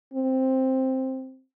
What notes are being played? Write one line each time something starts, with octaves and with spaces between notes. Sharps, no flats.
C4